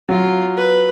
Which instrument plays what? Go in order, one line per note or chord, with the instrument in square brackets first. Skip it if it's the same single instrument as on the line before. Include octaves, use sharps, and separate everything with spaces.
[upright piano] F#3 [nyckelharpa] F4
[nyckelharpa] B4